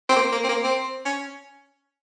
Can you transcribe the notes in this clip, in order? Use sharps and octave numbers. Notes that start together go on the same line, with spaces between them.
C4
A#3
A#3
C4
A#3
C4
C#4